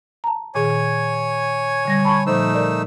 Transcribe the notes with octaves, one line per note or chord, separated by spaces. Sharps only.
A5 A#5
A#2 D#3 G#4 C#5 G#5
D3 G3 A#6
A5 B5 C#6
A#2 F3 A3 D#4 C5 E6
A#4 D5